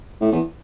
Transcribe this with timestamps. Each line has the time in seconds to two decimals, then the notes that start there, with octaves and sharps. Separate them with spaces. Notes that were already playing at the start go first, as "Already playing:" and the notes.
0.21 A2
0.32 E2